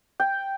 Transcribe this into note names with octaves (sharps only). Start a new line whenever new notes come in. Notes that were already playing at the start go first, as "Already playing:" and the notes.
G5